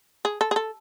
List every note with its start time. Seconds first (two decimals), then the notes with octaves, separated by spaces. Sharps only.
0.25 G#4
0.41 A4
0.51 G#4
0.56 A4